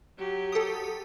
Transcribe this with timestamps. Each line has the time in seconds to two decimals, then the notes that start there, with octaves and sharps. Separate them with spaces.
0.18 F#3 G4
0.52 A4 D#6